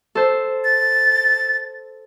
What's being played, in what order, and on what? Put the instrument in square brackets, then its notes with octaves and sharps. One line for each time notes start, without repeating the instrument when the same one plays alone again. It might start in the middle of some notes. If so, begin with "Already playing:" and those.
[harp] A4 C5
[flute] A6